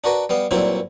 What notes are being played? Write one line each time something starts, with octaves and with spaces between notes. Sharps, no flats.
D4 F#4 A#4 B4
G3 B3 F5
G2 A#2 F#3 C4 C#4 E4